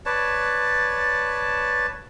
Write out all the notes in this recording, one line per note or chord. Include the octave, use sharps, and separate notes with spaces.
B4 C#5 D5 A5